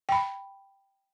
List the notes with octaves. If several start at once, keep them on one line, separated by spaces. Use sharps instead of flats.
G5 B5